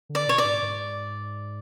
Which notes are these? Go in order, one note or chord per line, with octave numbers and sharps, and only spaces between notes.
D3
D5
B2 C#5
D5
G#2
G#2